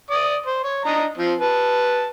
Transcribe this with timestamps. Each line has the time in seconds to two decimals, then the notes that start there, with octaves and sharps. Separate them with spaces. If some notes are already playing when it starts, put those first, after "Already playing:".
0.11 D5 D6 D#6
0.46 C5
0.64 C#5
0.85 D4 D#5 A#5
1.18 F3 C4
1.40 B4 A5